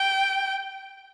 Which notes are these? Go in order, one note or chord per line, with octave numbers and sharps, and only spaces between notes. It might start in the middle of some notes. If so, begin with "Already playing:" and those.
Already playing: G5